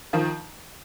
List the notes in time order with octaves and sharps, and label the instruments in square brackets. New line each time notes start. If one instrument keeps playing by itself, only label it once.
[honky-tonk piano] D#3 F3